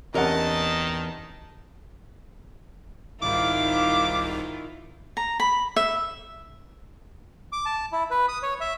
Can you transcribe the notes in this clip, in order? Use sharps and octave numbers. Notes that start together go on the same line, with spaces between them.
E2 C3 D#3 C#4 A#4 D#5 F#5 A5
C2 G#2 D#3 E4 F4 F5 D6
A#5
B5
E5
D6
A5
E4
B4
D#6
C#5
E5